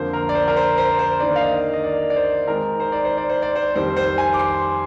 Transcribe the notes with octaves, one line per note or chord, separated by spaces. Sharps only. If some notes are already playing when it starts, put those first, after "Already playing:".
Already playing: F2 D3 F3 A#3 C5
A#4
D5
C5
A#4
C5
C5
C5
D#3 A#3 D4 D5
F5
D#5
D#5
D5
D5
C5
D#3 G#3 C4 D#4 A#4
C5
D5
C5
D5
C5
D5
C5
F2 D#3 G3 C4 C5
C5
G#5
D6
C6